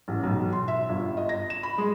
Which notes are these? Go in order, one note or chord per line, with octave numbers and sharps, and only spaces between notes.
A1
B1
C6
E5
G1
D#5
A#6
E7
B5
G#3